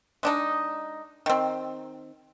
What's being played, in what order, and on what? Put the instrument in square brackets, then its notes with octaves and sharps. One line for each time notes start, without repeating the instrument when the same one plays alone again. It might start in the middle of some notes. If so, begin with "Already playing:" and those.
[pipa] G#3 D4 D#4
D#3 C4